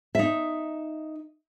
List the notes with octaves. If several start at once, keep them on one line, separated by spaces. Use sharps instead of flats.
D#4 E5